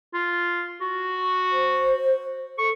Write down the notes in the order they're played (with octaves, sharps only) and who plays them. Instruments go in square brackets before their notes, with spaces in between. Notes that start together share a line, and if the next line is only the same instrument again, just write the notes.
[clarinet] F4
F#4
[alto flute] C5
[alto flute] A4 [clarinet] C#6